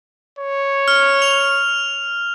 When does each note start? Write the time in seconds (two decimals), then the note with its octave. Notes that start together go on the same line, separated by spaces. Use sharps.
0.39 C#5
0.88 F6
1.22 F7